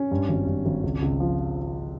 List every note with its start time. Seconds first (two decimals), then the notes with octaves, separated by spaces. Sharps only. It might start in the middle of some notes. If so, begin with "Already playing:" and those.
Already playing: C#4
0.11 G2
0.29 G#1
0.47 G2
0.66 G#1
0.83 C#2
1.02 C#2
1.20 F3